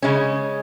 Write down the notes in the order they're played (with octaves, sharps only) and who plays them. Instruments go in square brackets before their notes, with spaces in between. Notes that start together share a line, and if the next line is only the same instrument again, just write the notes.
[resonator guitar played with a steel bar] C#3 G#3 C#4